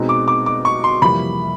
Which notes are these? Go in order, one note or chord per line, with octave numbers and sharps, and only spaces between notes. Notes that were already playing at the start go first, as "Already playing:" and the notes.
Already playing: B2 G#3 C4 D#4
D6
D6
D6
C#6
C6
F2 C3 E3 G3 A#3 B5